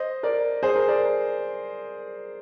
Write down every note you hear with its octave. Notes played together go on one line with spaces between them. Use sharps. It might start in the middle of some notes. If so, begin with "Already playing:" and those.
Already playing: C5 D#5
A#4 D5
G#4 C5
A#4
A#4 D5